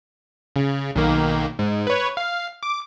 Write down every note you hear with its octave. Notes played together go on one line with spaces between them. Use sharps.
C#3
B1 D#3 A#3
G#2
B4 C#5
F5
D6